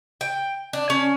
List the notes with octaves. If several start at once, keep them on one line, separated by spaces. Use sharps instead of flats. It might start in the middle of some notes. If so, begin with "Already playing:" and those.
G5
D4
C#4